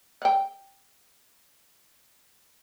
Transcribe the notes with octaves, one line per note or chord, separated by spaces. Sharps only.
F#5 G5